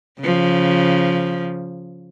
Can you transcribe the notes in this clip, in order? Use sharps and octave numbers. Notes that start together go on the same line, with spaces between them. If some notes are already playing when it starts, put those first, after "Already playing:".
C#3 F3